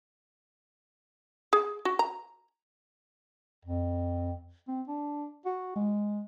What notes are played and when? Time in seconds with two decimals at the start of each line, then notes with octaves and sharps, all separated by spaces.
1.53 G#4
1.85 F#4
1.99 A#5
3.65 F2
4.68 C4
4.88 D4
5.45 F#4
5.76 G#3